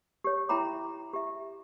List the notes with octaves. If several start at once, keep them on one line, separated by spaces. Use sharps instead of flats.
G4 C#5
E4 E5 G5 A#5 B5 D6
G4 E5